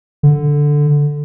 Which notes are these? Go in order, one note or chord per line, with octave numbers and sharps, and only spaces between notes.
D3